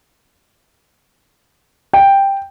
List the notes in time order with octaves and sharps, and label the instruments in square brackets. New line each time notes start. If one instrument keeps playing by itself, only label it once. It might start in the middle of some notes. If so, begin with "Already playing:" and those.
[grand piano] G5